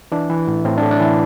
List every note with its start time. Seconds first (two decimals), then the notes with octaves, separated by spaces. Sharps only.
0.12 E3 D4
0.30 E3
0.48 A2
0.65 A2 C4
0.78 D4
0.82 A2
0.91 D4
1.00 E3 E4